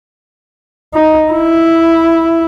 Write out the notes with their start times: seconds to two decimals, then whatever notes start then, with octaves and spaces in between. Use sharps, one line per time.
0.94 D#4
1.31 E4